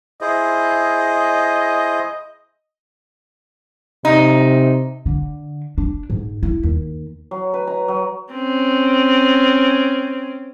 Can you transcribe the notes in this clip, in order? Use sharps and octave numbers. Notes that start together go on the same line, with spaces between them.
E4 G#4 C5 D#5
C3 D#4
D3
D4
G#2
E4
D#2
F#3
B4
A#5
F#3
C4 C#4